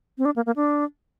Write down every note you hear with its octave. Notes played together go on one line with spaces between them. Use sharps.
C4
D4
A#3
A#3
D4